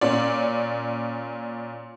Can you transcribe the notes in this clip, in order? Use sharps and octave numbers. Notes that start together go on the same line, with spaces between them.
A#2 C#4 D5